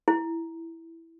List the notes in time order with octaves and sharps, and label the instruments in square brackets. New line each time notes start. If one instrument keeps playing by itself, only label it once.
[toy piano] E4